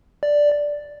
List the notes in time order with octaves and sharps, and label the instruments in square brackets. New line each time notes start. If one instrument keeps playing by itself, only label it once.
[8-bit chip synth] D5